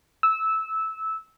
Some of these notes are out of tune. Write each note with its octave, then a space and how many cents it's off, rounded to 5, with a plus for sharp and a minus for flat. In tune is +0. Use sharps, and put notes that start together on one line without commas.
E6 -15